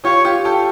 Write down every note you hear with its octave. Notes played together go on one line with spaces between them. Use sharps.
F4 G4 C#5
F4 G4
G4 A4